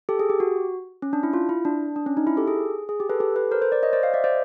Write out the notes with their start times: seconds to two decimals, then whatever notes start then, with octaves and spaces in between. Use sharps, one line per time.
0.09 G4 A4
0.19 G#4
0.30 G4
0.40 F#4
1.02 C#4
1.13 D4
1.23 E4
1.33 F4
1.49 E4
1.65 D4
1.96 D4
2.06 C#4
2.17 D#4
2.27 E4
2.37 G4 A4
2.48 G#4
2.89 G#4
3.00 G4
3.10 A4 B4
3.20 G4 A4
3.36 A4 B4
3.51 A#4 C5
3.62 A#4 C5
3.72 C5 D5
3.83 C#5 D#5
3.93 C5 D5
4.03 D#5 F5
4.14 D5 E5
4.24 C5 D5